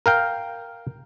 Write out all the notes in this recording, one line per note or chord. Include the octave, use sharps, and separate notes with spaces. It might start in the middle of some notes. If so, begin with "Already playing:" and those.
A#4 F5 G5